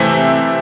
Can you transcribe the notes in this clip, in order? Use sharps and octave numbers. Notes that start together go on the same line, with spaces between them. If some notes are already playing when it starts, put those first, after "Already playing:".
Already playing: C3 E3 A3 C4 E5